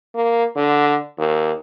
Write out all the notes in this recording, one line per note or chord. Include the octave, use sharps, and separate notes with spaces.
A#3
D3
D#2